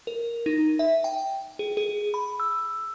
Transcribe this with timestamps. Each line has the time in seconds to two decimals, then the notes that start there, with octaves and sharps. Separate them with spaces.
0.07 A#4
0.46 D#4
0.79 E5
1.04 G5
1.59 G#4
1.77 G#4
2.14 B5
2.40 E6